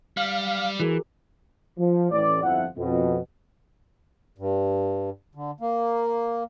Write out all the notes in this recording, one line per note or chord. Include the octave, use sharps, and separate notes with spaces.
G3 F5
E3 F#4 G#4 A#4
F3
A1 D5
G1 F2 F3 E4 E5 F#5
F2 B2
G2
D3
A#3